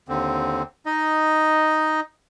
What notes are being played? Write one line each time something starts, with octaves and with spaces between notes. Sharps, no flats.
D#2 D3 C4
D#4 D#5